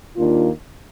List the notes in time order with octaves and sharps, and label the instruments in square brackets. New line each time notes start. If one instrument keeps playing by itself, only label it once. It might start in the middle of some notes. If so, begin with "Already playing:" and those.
[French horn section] D#2 D#3 A#3 D4 F4